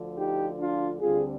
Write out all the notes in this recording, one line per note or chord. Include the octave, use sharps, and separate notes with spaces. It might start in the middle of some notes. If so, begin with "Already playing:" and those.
Already playing: D2 D3 F3
D#4 G4
D4 F4
D2 D3 G3 C4 F4 G#4